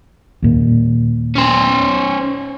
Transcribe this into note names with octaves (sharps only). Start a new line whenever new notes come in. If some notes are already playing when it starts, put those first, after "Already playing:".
D#2 A#2
C#4 C5